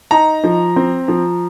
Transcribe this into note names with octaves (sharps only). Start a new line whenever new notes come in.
D#4 A#5
F3
C4
F3